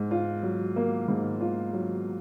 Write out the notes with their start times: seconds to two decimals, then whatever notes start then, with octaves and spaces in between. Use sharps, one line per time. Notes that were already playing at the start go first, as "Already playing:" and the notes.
Already playing: G#2
0.11 F4
0.43 F#3
0.76 A#3
1.08 G#2
1.41 F4
1.73 F#3